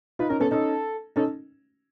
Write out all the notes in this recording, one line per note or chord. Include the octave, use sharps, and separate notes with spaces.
D#4 F4 B4
C#4 D#4 A#4
B3 C#4 A4
C#4 D#4 A4
C#4 D#4 A4